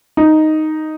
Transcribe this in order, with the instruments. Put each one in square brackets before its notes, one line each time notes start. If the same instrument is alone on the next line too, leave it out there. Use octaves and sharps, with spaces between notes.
[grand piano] D#4